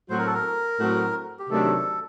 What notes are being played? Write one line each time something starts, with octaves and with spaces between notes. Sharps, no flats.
A2 F#3 C4 F#4 C5
A#4
A4
A#4
A2 F#3 C4 F#4
G4
C3 D#3 F#3 A3 D4 A4